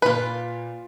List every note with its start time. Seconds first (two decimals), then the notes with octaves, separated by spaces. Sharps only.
0.02 A#2 F4 B4 B6